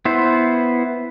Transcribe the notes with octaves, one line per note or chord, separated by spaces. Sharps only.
B3 E4 C5